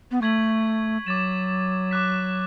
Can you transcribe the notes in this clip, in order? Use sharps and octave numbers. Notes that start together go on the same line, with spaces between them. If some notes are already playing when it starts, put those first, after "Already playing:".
B3
A3 C#6 G#6 B6 F#7
F#3 D6 A6 E7
D6 F#6 B6